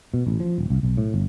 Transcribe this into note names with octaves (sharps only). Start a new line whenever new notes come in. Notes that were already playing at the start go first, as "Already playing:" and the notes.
B2
A1
F3
D#1
C2
B1
A2
G1